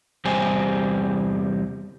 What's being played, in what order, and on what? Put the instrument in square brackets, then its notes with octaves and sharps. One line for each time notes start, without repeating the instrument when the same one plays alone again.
[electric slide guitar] E2 C3 G3 G4 C5 G#5